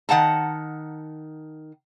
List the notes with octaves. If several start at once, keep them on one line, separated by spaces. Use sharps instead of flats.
D#3 F#5 A5 A#5